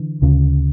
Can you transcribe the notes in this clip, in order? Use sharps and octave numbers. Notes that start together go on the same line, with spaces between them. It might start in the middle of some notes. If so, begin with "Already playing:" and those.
Already playing: D3 E3
D2 C#3